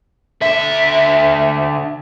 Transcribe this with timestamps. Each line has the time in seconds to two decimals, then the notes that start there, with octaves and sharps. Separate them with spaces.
0.41 D3 E5